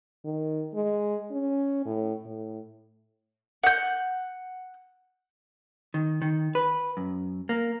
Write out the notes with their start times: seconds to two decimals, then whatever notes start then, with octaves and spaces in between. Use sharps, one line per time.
0.25 D#3
0.74 G#3
1.31 C#4
1.86 A2
2.26 A2
3.63 F#5 G6
5.94 D#3
6.22 D#3
6.55 B4
6.97 F#2
7.49 A#3